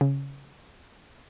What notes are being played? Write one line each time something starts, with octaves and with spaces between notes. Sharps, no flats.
C#3